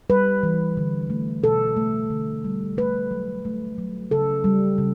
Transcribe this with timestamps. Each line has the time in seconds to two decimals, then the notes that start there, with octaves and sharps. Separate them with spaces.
0.10 G3 B4
0.43 E3
0.77 D3
1.10 A3
1.43 B2 A4
1.76 A3
2.10 D3
2.44 G3
2.77 A3 B4
3.11 F#3
3.45 A3
3.78 F#3
4.11 C#3 A4
4.44 G3
4.78 C#3